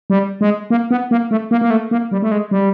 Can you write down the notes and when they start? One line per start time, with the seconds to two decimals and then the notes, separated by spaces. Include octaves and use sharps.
0.10 G3
0.41 G#3
0.70 A#3
0.91 B3
1.11 A#3
1.31 A3
1.51 A#3
1.61 A#3
1.70 A3
1.91 A#3
2.11 G3
2.22 A3
2.32 G#3
2.51 G3